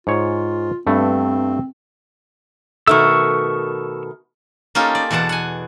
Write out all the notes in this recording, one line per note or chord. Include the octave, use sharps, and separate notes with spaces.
G#2 F4 C#5
G2 A3 B3 C4
B2 D#3 A3 C#6 E6
A#3 C#4 D#4 F4 G4 A4
D5
E2 B2 D5 F#5 A5
F#5 G#5